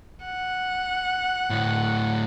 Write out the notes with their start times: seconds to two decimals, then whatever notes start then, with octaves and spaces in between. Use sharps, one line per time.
0.25 F#5
1.50 D2 A2